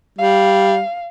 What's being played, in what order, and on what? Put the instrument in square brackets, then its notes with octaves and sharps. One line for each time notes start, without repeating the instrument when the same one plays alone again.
[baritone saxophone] G3 [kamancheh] F5